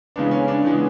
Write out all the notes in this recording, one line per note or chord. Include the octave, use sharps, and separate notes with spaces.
C#3 E3 G#3 B3 D4
C#4
D4
C#3 E3 G#3 B3